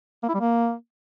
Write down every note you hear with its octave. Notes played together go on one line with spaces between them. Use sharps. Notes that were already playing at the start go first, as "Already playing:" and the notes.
A#3
E4
G3
A#3